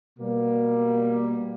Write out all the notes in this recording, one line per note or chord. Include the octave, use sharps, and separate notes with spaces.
B2 G3 A#3